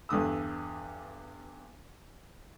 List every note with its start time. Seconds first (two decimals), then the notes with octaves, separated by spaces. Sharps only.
0.09 E2 G2 D3 D#6 E6